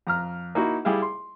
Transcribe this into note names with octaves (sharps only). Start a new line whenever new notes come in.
F2 A#5 F6
A#3 D#4 E4 F#4
G3 E4 G#4 F5
C6